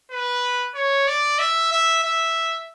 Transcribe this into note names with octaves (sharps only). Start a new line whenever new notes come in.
B4
C#5
D5
E5
E5
E5